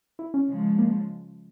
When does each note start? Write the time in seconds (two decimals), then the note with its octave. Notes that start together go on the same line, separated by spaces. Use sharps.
0.19 E4
0.34 C#4
0.48 C#3 F3 G#3
0.78 A#3